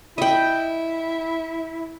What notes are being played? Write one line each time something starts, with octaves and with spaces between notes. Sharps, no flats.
E4 D#5 G5